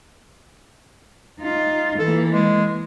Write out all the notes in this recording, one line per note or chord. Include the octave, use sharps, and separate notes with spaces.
D#4 F4
E3 A#3 A4
G#3